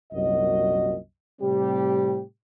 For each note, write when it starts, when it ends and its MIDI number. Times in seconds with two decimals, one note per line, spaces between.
0.13 0.95 36
0.13 0.95 42
0.13 0.95 46
0.13 0.95 66
0.13 0.95 75
1.41 2.21 45
1.41 2.21 48
1.41 2.21 55
1.41 2.21 60
1.41 2.21 67